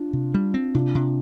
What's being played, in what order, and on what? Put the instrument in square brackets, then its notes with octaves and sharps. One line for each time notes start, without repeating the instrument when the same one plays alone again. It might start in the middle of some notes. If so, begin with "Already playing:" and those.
Already playing: [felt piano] D4 F4
[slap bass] C3
G3
C4
[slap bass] C3 [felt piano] D4 F4
[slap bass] C3